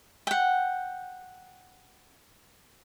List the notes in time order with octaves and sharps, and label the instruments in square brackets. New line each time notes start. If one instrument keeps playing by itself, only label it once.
[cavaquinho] F#5 G5